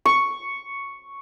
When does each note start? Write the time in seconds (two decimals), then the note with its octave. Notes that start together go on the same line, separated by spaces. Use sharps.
0.05 C#6